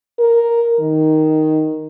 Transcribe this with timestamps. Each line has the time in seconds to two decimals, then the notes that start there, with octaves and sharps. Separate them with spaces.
0.19 A#4
0.80 D#3